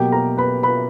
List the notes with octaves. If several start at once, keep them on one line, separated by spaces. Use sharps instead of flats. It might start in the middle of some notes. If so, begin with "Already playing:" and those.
Already playing: B2 F#3 A#3 G4 G5
A#4 A#5
B4 B5
B4 B5